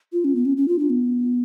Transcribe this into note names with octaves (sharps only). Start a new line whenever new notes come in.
F4
C#4
B3
C#4
C#4
F4
D4
B3